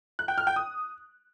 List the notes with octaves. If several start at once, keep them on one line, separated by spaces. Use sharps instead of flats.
F#6
G5
F6
G5
D#6